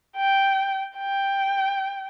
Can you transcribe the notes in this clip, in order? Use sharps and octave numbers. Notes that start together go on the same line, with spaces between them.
G5
G5